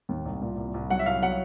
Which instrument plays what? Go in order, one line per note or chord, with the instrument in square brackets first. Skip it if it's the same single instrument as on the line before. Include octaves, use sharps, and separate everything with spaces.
[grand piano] D#2
C2
A#2
C2
C2
[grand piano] F#3 [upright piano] F#5
[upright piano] E5
[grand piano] C2 [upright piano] F5
[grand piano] F#3 [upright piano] F#5